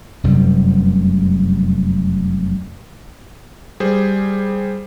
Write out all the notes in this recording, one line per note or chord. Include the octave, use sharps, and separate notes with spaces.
F1 F#2 C3 G3
G3 G#4 C5